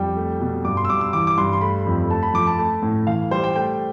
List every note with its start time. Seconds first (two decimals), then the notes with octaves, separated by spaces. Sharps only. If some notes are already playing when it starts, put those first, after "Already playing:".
Already playing: F2 G3 G5
0.17 A3
0.40 B2
0.65 G2 D6
0.77 C6
0.85 E6
0.89 G2 D6
1.01 E6
1.13 E3 D6
1.27 D6
1.38 G2 C6
1.53 C6
1.61 A3 B5
1.86 F2
2.10 A3 A5
2.23 B5
2.34 F3 D6
2.47 A5
2.58 A3
2.82 A2
3.07 E3 F5
3.31 G3 C5
3.44 G5
3.55 A3 G5